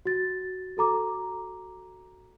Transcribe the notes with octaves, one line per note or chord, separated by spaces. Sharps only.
F#4 A6
F#4 A4 A#5 D6